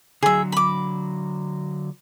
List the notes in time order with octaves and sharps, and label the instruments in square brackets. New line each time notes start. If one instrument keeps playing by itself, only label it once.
[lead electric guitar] D3 F#3 [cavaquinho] G#4 E5
[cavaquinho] B5 D6